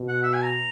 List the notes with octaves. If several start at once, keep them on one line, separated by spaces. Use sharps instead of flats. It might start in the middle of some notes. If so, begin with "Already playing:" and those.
Already playing: B2
F#5
E5
G#5
A#5